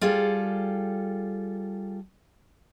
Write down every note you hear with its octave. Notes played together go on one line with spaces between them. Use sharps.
G3 F4 G#4 A4